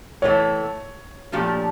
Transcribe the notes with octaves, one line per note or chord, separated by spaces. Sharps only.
A2 E3 A3 C#5
A#2 F3 A3 D4 G4